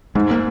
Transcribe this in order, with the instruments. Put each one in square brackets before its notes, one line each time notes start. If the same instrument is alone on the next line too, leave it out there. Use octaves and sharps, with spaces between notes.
[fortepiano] G#2 [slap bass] G#3
[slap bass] A#3